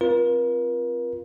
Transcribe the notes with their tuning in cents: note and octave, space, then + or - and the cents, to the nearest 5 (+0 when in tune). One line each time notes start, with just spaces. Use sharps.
C4 +0 F4 +0 A#4 +40